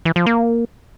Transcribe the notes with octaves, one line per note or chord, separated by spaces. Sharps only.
E3
F3
A#3